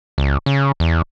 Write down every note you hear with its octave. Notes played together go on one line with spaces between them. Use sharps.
C#2
C#3
E2